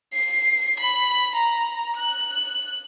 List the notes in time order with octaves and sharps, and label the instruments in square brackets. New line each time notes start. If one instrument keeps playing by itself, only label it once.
[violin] C7
B5
A#5
F#6